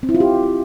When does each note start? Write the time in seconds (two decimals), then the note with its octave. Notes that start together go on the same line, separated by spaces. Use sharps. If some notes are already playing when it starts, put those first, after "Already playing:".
0.03 C4
0.09 E4
0.15 F4
0.20 G4